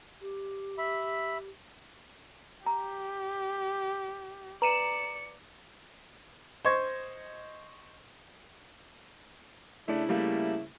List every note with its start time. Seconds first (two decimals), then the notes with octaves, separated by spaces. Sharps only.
0.21 G4
0.78 E5 B5
2.66 G4 A#5
4.62 B4 D5 A#5 C#7 D#7 E7
6.65 C5 D#5 C#6 G#6
9.88 C#3 A3 D4 E4
10.09 G3 A3 A#3